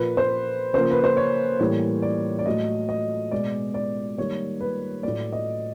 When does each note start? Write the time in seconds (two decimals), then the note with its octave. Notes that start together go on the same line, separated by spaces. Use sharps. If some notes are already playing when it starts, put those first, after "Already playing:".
Already playing: A#2 F3 A#3 B4
0.17 C5
0.73 C#3 F3 A#3 C5
0.91 B4
1.04 C5
1.17 C#5
1.60 A2 E3 G3 A#3 C#5
2.02 D5
2.39 D5
2.46 A2 F#3 A3 D#5
2.89 D#5
3.32 B2 G#3 B3 D5
3.74 D5
4.18 D#3 G3 A#3 C#5
4.61 B4
5.03 A2 F#3 A3 D5
5.33 D#5